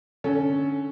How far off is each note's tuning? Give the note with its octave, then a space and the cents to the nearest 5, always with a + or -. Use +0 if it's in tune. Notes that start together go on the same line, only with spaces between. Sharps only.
D3 +10 C#4 +0 A4 -20